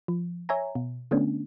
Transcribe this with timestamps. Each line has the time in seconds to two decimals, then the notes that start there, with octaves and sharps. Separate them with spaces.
0.08 F3
0.49 C#5 E5 G#5 A#5
0.75 B2
1.11 D3 A3 B3 C#4 D4